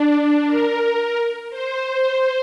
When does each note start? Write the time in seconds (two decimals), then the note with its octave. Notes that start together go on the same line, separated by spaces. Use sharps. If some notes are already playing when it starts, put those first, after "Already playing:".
Already playing: D4
0.47 A#4
0.81 A#4
1.50 C5